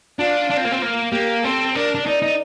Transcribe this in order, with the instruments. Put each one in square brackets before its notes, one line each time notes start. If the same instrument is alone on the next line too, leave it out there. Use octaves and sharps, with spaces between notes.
[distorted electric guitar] D4 [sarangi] F4
[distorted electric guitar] D4
C4
A#3
C4
A#3
[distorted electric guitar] A#3 [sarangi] G4
[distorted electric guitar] C4 [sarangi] A4
[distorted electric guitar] D4 [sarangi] A#4
[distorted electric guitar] D4
[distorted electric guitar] D#4 [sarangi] D5
[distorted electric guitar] D#4